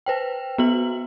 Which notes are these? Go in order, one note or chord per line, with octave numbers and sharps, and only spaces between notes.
B4 C5 G5
B3 F#4 F#7